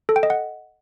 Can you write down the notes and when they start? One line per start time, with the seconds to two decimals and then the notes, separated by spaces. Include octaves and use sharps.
0.09 A4
0.16 G5
0.23 D#5
0.30 F#5